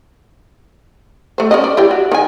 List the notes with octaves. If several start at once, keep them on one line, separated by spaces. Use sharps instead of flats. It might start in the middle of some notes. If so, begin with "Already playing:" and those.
A3 C5
C#4 D#4 D#5
D5
E4 G4 D5
F#4
D#3 G#5